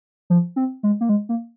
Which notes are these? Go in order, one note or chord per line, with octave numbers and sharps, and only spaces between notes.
F3
C4
G#3
A#3
G#3
A#3